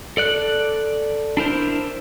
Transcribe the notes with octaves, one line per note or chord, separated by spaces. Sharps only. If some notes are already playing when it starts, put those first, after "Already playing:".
A4 D5 F#6
D4 E4 A#4 C5